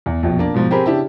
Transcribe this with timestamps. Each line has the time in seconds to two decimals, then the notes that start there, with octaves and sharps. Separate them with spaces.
0.06 E2
0.23 A#1 F2 B2
0.39 A#3 D4
0.54 G#2 B2 F3
0.71 C4 G4 G#4 A#4 C5 B5
0.86 C#3 D4 E4 G4